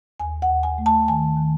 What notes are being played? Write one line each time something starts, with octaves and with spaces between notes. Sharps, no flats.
D#2 G#5
F#5
D#2
G#5
A3
A5
D#3 G#5
D#3